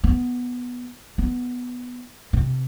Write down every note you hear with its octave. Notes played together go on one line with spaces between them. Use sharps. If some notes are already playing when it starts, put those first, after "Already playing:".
B3
B3
C3